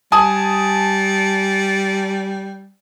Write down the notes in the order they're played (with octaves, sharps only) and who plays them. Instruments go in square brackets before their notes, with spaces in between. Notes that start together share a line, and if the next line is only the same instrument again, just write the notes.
[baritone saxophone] G3 [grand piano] G#5 A5 D#6